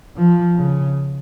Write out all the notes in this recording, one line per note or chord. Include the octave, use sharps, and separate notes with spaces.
F3
C#3